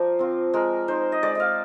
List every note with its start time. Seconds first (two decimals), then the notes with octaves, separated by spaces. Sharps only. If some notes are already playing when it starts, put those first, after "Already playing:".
Already playing: F3 A#4 C5 D5
0.19 C4 F4
0.54 G#3 A#4
0.88 D#4 C5
1.12 D#5
1.23 G#3 D5
1.35 D#5 F5